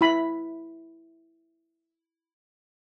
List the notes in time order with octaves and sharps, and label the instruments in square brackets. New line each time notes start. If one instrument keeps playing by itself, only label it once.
[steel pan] E4 B5